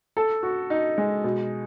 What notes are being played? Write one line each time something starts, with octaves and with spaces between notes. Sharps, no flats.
A4
F#4
D#4
G#3
B2